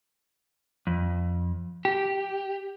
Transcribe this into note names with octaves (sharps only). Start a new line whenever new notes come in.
F2
G4